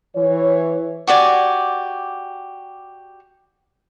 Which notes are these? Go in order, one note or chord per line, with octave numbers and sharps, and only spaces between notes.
E3 C#5
F#4 G4 D5 G#5